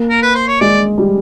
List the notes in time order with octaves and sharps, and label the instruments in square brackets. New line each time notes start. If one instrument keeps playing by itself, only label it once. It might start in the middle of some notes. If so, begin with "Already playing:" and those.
Already playing: [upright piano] A#3
[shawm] A#4
B4
C5
C#5
[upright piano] G#3 [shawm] D5
[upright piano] G3